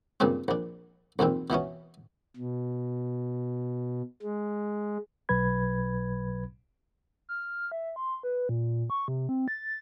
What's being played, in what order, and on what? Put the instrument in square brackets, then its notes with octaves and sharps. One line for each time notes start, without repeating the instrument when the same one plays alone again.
[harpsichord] G2 A#2 C#3 A#3 C4
A#1 D4
B1 E2 A#2 C4
B2 E3 B3 C#4
[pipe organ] B2
G#3
[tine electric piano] B1 B2 F#3 B4 B5 G#6
[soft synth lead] F6
E5
C6
B4
A#2
C#6
C3
C4
A6